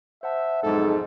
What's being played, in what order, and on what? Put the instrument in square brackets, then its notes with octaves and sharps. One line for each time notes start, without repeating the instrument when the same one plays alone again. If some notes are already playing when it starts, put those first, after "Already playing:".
[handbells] C5 F#5 A5 [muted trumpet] E5
[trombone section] B1 F2 G#2 [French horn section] G#3 D#4 [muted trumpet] A4